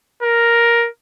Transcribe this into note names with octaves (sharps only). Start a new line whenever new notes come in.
A#4